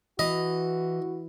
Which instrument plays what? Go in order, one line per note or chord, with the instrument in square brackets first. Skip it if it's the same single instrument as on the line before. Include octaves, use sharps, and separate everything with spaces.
[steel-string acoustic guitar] E3 [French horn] F#4 [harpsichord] D#5